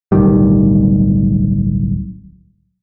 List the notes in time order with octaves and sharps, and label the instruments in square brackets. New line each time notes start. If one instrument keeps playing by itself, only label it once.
[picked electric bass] D1 B1 D#3 G3